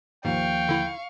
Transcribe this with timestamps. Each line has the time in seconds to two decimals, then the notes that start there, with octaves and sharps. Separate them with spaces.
0.25 D#2 G#2 F3 F5 G5 C#6
0.69 D3 E4